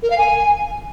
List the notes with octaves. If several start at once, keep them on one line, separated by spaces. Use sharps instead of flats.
A#4
F5
G#5